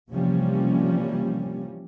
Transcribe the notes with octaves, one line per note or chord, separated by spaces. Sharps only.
C3 E3 F3 G3 A#3 C#4